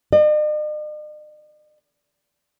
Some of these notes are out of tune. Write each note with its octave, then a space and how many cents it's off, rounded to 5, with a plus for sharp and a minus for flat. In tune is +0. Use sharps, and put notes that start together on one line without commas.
D#5 -45